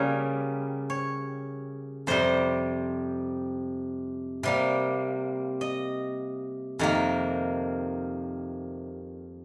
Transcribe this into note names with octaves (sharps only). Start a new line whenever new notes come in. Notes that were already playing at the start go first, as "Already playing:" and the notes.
Already playing: C#3 G3 A#3 C#5
C#5
F2 C3 G3 C5
C3 G3 A#3
D#5
F2 C3 D#3 A#3